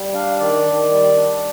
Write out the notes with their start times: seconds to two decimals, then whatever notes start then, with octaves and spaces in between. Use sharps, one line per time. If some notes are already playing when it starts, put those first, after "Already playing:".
Already playing: G3
0.14 D4 F5
0.39 D#3 D5
0.66 D#3
0.91 G3
1.16 D4